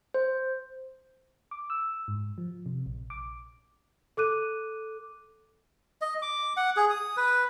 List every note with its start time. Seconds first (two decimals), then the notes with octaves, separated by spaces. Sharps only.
0.14 C5
1.51 D6
1.70 E6
2.08 G#2
2.38 F3
2.66 C3
2.86 A#1
3.10 D6
4.17 A4 D6 F#6 D#7
6.01 D#5
6.22 D6
6.57 F#5
6.76 G#4
6.90 D#6
7.17 B4